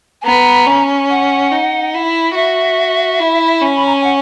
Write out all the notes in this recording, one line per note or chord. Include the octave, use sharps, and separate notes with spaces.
G#5
B3 A#5
C#4
F#5
D#4
E4
F#4 E5
E4
C#4
B5
A#5
G#5
F#5